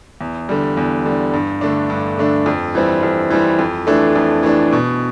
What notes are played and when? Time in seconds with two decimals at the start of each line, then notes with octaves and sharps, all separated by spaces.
0.21 E2
0.49 D3 G3
0.77 E2
1.06 D3 G3
1.33 G2
1.61 D3 A3 D4
1.90 G2
2.17 D3 A3 D4
2.46 F2
2.75 E3 G3 C4
3.03 F2
3.30 E3 G3 C4
3.59 F2
3.87 E3 A3 D4
4.16 F2
4.43 E3 A3 D4
4.72 B2